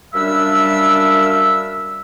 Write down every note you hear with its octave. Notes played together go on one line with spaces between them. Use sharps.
F#2 G3 D4 E5 F5 E6